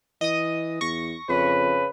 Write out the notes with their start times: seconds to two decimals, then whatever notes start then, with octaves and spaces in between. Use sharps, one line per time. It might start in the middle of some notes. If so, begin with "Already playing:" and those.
0.21 E3 D#5 D#6
0.81 E2 C#6 A#6
1.29 F2 C#3 B4